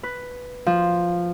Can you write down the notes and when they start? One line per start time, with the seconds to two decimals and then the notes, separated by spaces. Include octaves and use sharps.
0.03 B4
0.66 F3